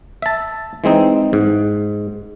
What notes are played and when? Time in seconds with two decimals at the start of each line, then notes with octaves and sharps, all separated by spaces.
0.22 E5 A5
0.84 E3 G#3 C4 D#4
1.33 G#2